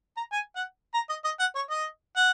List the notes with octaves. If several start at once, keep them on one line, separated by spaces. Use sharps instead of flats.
A#5
G#5
F#5
A#5
D#5
D#5
F#5
C#5
D#5
F#5